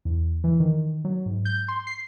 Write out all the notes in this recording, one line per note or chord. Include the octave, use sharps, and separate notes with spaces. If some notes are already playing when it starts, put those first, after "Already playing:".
E2
E3
D#3
F#3
G#2
G6
C6
C7